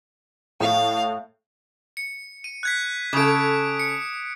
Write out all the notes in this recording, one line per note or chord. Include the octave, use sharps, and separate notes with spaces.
A2 F5
C#7
D#7
F#6 G#6 B6
C#3 A4 D6 D#6 D7
C#7